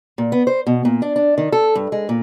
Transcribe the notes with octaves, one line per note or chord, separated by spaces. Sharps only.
A#2
B3
C5
B2
A#2
D4
D4
D#3
A4
G2
G#3
A#2